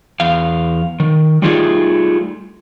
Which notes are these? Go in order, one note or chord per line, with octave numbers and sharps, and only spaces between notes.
E2 F5
D#3
G3 A3 D#4 F4 G#4 D5